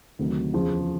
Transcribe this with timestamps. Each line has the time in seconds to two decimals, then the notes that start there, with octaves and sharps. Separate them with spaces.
0.19 D2 C3 D#3 F#3
0.53 E2 C#3 F3